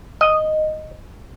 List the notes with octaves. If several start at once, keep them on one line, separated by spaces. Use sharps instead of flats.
D#5